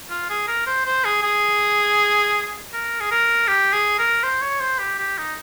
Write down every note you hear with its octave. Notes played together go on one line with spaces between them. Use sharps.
F4
G#4
A#4
C5
C5
G#4
G#4
A#4
G#4
A#4
G4
G#4
A#4
C5
C#5
C5
G4
G4
D#4